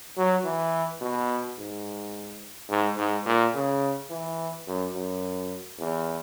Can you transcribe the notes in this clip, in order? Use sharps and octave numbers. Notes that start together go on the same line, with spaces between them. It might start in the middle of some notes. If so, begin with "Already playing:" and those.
F#3
E3
B2
G#2
G#2
G#2
A#2
C#3
E3
F#2
F#2
E2